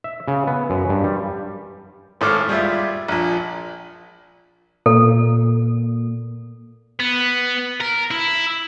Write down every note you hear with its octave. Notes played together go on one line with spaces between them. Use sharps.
E5
C#3
B3
F#2
G2
G3
G#1 A2 A4 D6 F6
G3 G#3 F4 E5
A#1 A#2
A#2 A4
B3
A#4
E4